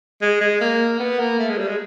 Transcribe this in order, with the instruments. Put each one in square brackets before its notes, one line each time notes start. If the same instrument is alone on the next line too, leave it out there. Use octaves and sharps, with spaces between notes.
[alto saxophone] G#3
G#3
A#3
B3
A#3
A3
G#3
G3
G#3